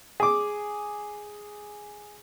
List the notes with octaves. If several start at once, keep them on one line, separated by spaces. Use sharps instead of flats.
G#4 D6